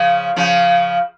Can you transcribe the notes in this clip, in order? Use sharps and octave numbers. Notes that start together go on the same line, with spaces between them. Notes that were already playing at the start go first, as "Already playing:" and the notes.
Already playing: C#3 F3
C#3 F3